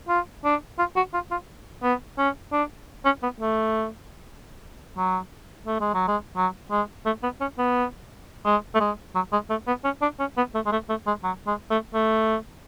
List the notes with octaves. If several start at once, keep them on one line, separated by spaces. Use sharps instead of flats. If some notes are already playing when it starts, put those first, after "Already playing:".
F4
D4
F4
F#4
F4
F4
B3
C#4
D4
C#4
B3
A3
F#3
A3
G#3
F#3
G#3
F#3
G#3
A3
B3
C#4
B3
G#3
A3
G#3
F#3
G#3
A3
B3
C#4
D4
C#4
B3
A3
G#3
A3
A3
G#3
F#3
G#3
A3
A3